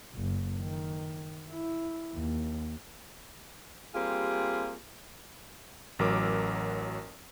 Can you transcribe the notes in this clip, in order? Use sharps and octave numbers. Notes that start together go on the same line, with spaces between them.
F#1
D#3
E4
D#2
G3 A#3 C4 F4 G4 G#4
A1 F#3 A#4 D6 E6